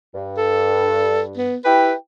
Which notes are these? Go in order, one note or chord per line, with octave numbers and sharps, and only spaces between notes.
G2
A4
B3
E4 G4 B4 G5